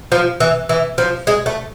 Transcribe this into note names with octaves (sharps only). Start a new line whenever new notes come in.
F3
E3
E3
F3
G#3
A3